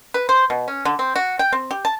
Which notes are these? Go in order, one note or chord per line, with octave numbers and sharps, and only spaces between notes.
B4
C5
B2
C#4
D3
C4
F#4
G5
C4
G4
A5